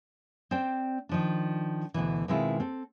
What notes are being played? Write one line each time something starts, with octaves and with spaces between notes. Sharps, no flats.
C4 C5 D5 G5
D#3 F3 D4
D2 G2 B2 E3
B2 D#3 G#3 C4 E4 F4
C4 A4